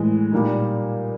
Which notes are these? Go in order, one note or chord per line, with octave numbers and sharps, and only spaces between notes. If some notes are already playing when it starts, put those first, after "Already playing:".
Already playing: A2 E3 G#3
A#2 G3 A#3 D#4